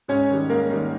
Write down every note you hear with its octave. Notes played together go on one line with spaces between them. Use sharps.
G#2 C#4 C#5
D#3 G3
G#2 A#3 A#4
D#3 G3